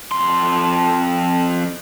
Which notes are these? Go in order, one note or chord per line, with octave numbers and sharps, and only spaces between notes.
F2 C6